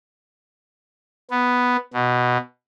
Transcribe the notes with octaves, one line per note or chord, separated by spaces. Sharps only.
B3
B2